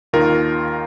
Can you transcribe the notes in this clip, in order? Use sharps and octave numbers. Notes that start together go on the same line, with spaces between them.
D#2 D#3 F4 A#4